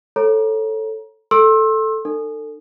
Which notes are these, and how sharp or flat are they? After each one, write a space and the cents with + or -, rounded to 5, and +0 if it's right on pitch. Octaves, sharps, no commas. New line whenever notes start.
A4 +0 C#5 -25 A#5 +25
A4 +0 C6 +35 E6 +0
D#4 -45 A4 +25